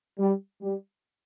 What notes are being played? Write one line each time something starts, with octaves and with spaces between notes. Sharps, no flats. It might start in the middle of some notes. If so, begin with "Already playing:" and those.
G3
G3